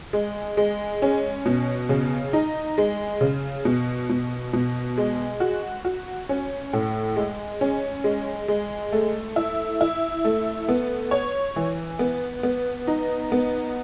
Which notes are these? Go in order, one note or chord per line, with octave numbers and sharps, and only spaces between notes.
G#3
G#3
C#4
B2
C#3
D#4
G#3
C#3
B2
B2
B2
G#3
F#4
F#4
C#4
A2
G#3
C#4
G#3
G#3
A3
E4
E4
A3
B3
C#5
E3
B3
B3
D#4
B3